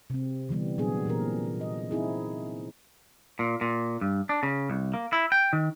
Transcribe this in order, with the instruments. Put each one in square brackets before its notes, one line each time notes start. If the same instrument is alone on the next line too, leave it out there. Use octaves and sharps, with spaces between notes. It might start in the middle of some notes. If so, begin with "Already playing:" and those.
[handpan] C3 C4
D3 E3 G3 B3
A#2 F#3 B3 D4 G#4
A#2 E3 C4 A#4
D#5
C4 D#4 E4 G#4
[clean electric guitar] A#2
A#2
G2
D4
C#3
C2
A#3
E4
G5
D#3